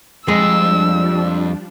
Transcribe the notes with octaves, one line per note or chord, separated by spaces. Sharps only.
F2 F3 G3 G#3 D4 E6